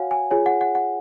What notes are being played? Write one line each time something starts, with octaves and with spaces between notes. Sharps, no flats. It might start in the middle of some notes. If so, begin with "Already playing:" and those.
Already playing: F#4 C#5 F5 F#5 G#5
G#5
F4 G#4 C#5 G#5
F#5
F#5
F#5